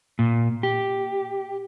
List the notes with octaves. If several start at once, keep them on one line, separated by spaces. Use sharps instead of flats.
A#2
G4